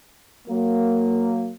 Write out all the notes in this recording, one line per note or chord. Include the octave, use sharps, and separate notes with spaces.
F#3 A#3